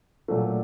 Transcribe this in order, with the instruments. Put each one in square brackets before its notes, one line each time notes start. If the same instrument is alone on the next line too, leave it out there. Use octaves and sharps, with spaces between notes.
[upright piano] A#2 F#3 A3 D4